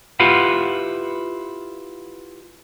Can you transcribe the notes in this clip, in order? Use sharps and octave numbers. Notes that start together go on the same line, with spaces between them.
E4 F4 G4 B4 F5 F#5